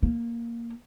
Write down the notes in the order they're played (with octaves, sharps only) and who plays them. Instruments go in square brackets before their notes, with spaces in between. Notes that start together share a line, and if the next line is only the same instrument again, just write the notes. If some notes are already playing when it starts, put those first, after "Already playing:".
[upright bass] A#3